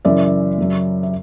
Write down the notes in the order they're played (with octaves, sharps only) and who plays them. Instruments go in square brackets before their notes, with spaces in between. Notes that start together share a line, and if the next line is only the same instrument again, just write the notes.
[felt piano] F#2 C#3 E3 D5 E5
F#2 C#3 F#3
E5